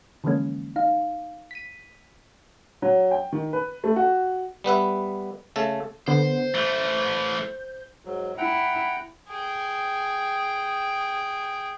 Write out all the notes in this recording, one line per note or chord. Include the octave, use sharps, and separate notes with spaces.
D3 E3 F3 G#3 A#3 C#4
D#4 F5
B6 D#7
F#3
G5
D#3
B4
A3
F#4
G3 B3 B4 E5
C#3 A3 A4
D3 B3 C5
E3 A3 G6
G#2 F#3
E4 F#5 G5 A#5
G#4 G5